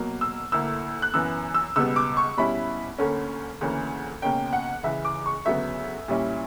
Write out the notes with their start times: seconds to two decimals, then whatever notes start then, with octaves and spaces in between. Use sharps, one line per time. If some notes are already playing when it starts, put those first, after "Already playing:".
Already playing: B2 F#3 A#3
0.21 E6
0.52 D2 D3 A#3 E4 E6
1.02 F#6
1.14 F#2 E3 B3 E6
1.54 E6
1.76 C#2 B2 G3 B3 E6
1.96 D6
2.17 C#6
2.37 B2 G3 C#4 E4 B5
2.98 D2 D3 A#3 C#4
3.61 D2 C#3 E3 A#3 C#4
4.22 C#2 B2 A#3 C#4 G5
4.47 G5
4.53 F#5
4.83 C#2 C#3 E3 E5
5.05 D6
5.26 C#6
5.45 D2 C#3 F#3 B3 E5
6.08 A#2 G3 C#4 E4